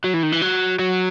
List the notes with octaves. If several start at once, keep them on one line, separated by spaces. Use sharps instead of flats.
F#3
E3
D#3
E3
F#3
F#3